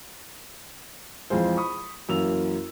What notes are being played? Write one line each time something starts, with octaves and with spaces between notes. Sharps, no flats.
F2 E3 G#3 F4 G#4 C5
B5 C#6 D#6
F#2 E3 A#3 E6 F7